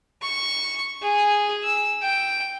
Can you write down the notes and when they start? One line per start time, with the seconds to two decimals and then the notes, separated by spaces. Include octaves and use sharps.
0.22 C#6
1.02 G#4
1.63 E6
2.02 G5